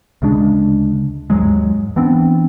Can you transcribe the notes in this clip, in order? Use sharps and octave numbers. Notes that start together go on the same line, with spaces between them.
D2 C#3 G#3 D4
D#2 G#2 F#3 G#3
E3 B3 C4 D4